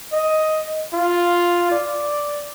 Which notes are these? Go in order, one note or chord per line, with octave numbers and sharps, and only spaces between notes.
D#5
F4
D5